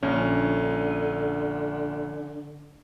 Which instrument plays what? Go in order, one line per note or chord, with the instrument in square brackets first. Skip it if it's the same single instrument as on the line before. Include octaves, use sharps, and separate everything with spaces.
[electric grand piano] A#1 C#4 [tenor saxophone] D3